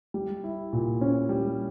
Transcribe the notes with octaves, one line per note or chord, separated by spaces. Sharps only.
G3
E4
A#2
C#4
G3